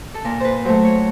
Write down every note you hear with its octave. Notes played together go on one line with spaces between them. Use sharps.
A4
A#2 A#4
B4 C5
F#3 A3 C5
C#5